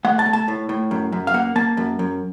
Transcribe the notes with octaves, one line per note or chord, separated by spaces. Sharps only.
A3 F#5
A5
A3
A5
A2
A2
F#2
F#2
F5
A#3 F#5
A#3 A5
F#2
F#2